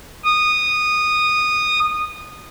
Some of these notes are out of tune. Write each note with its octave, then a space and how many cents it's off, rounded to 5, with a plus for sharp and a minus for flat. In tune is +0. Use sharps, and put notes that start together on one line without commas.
D#6 -15